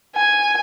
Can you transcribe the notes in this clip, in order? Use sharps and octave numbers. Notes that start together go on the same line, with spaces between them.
G#5